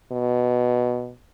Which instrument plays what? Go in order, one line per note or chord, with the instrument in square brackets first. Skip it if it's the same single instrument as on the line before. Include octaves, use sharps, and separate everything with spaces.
[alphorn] B2